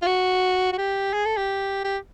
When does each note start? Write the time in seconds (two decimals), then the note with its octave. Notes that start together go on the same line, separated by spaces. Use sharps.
0.02 F4
0.07 F#4
0.73 F#4
0.78 G4
1.13 G#4
1.26 A4
1.37 G4
1.84 G4